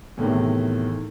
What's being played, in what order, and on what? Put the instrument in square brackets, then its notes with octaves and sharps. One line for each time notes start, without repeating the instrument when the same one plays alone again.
[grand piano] E2 A2 C3 D#3